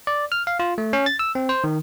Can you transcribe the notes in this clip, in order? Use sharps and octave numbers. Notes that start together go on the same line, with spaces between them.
D5
F6
F5
F4
A3
C#4
A6
E6
C4
C5
D#3